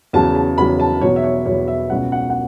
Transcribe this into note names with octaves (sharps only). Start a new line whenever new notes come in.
E2 C#3 F#3 A5
A5
E2 C#3 F#3 B5
A5
E2 B2 F#3 C#5
E5
C#5
E2 B2 F#3 C#5
E5
C#2 B2 F#3 F#5
F#5
F#5